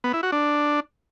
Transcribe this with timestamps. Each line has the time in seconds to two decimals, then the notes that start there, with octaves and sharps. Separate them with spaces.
0.04 B3
0.13 E4
0.23 F#4
0.32 D4